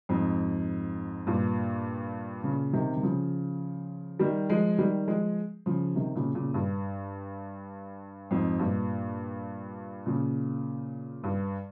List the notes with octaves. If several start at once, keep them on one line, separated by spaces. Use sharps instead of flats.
F2 G#2
G2 A#2
A#2 C#3
C3 D#3
D#3
C#3 F3
D#3 G3
F3 G#3
D#3 G3
F3 G#3
C#3 F3
C3 D#3
A#2 C#3
A#2 C#3
G2
F2 G#2
G2 A#2
A#2 C#3
G2